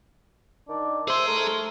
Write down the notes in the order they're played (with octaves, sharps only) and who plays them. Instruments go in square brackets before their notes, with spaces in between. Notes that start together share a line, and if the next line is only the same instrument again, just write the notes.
[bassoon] D#3 [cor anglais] D4
[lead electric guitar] G#4 C6 [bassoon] C5 [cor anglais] E5
[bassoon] A3 [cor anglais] A#4